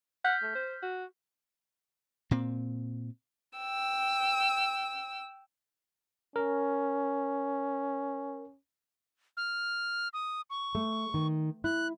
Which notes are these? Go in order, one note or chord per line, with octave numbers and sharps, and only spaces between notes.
F#5 F6 G6 B6
A3
C5
F#4
A#2 C4
G5 E6
C#4 A#4
F6
D#6
C#6
A3
D#3
E4 F#6